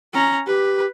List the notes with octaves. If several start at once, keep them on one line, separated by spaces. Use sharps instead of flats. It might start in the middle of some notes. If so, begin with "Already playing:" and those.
C#4 A#5
G4 B4